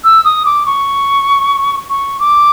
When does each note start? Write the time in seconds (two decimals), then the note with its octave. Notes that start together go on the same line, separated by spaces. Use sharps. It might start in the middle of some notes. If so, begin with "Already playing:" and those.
0.04 E6
0.25 D#6
0.45 D6
0.66 C#6
1.90 C#6
2.20 D6